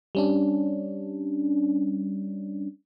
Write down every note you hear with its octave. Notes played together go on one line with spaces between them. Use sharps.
G3 C#4 D4